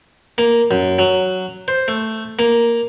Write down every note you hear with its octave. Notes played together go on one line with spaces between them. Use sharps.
A#3
F#2
F#3
C5
A3
A#3